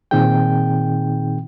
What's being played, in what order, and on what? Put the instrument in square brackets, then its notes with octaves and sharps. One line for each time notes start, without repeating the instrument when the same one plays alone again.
[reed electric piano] A#2 D#3 C4 D#4 G#4 G5